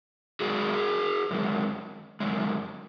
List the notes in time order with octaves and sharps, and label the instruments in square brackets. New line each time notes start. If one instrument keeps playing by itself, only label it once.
[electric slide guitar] F#2 D#3 G#3 F#4 G#4
F#2 D#3 G#3
F#2 D#3 G#3